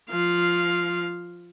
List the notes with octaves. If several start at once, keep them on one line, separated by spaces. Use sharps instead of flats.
F3 F5